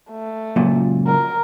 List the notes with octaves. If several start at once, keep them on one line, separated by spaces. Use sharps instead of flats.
A3
C#2 F#2 A#2
A#4